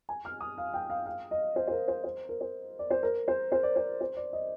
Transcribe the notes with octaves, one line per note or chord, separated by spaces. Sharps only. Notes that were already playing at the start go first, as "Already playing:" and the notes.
G#5
F6
D#6
F5
G5
F5
F5
D#5
C5
C5
A#4
C5
C5
A#4
C5
D5
C5
A#4
C5
C5
D5
C5
C5
D5
D#5